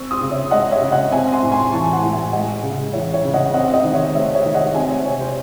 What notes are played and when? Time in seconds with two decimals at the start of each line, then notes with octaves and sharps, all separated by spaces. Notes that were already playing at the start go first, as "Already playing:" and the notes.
Already playing: C4 C#6 E6
0.11 C6 D#6
0.21 C#3
0.31 C#5 E5
0.51 G#3 D#5 F#5
0.71 C#5 E5
0.82 C#3
0.91 D#5 F#5
1.11 C4 E5 G#5
1.32 G#5 C6
1.42 A2
1.48 C#6
1.52 G#5 C6
1.72 E3 A5 C#6
1.92 F#5 A5
2.03 A2
2.13 E5 G#5
2.33 G#3 D#5 F#5
2.63 C#3
2.93 E3 C#5 E5
3.13 C#5 E5
3.24 C#3
3.34 D#5 F#5
3.54 C4 D#5 F#5
3.73 C5 D#5
3.84 D#3
3.94 C#5 E5
4.14 A3 C#5 E5
4.34 C#5 E5
4.45 D#3
4.54 D#5 F#5
4.74 C4 E5 G#5
4.90 C#5
5.05 C3 C#5
5.20 C5